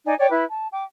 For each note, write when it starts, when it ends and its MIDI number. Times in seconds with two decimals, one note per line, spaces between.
0.06 0.14 63
0.06 0.14 74
0.06 0.14 80
0.19 0.29 73
0.19 0.29 74
0.19 0.29 79
0.19 0.29 86
0.31 0.45 64
0.31 0.45 71
0.50 0.68 81
0.73 0.84 79
0.73 0.84 86